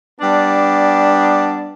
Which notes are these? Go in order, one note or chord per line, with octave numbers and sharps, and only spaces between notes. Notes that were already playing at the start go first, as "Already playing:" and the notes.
G3 B3 D4